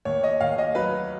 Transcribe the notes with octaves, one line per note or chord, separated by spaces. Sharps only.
D#2 C#5
D#5
D#2 F5
D#5
F#3 B4